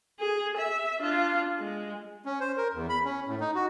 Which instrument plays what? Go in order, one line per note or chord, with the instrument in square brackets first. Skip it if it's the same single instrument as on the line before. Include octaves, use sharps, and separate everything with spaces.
[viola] G#4
E5
D4 F4
G#3
[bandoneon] C#4
C5
A#4
E2
B5
C#4
A2
D#4
F#4